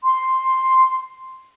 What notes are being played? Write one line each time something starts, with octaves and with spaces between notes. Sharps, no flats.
C6